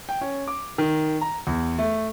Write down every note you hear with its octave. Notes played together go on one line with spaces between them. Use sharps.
G5
C#4
D6
D#3
A#5
E2
A3